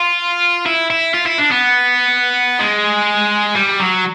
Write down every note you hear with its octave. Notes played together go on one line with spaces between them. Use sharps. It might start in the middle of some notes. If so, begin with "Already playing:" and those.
Already playing: F4
E4
E4
F4
E4
D4
B3
G#3
G3
F#3